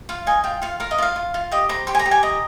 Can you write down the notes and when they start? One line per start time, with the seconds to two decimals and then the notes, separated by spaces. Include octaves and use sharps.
0.09 F4 F5
0.26 D#5 G#5
0.44 F4 G5
0.62 F4 F5
0.80 A#4 F5
0.91 D#5
0.98 F4 F5
1.16 F4
1.34 F4
1.51 G4 D#5
1.69 C5 A#5
1.87 G4 C6
1.95 G#5
1.99 A#5
2.06 G4
2.11 G#5
2.23 D#5 A#5